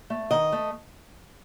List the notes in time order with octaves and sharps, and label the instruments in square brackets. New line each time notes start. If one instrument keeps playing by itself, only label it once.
[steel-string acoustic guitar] A3
D#3 D#5
A3